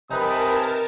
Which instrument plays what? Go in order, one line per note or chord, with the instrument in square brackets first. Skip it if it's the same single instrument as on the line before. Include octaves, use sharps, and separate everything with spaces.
[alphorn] C3 [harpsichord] D#4 B4 [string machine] A#4 A5 [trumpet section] G#5 B5 D#6